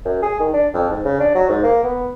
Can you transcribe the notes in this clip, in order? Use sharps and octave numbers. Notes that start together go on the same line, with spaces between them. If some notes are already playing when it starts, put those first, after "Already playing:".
F#2
G#4
D#3
D4
F2
G#2
C#3
D4
F#3
G#2
A#3
B3